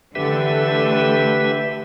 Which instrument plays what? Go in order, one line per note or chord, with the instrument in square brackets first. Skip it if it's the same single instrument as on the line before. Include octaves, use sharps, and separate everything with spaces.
[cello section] D3 E3 A3 [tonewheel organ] G4 B4 E5